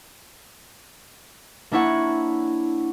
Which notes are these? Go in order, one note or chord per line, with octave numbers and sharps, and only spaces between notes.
A#3 D4 E4 C#5 F#5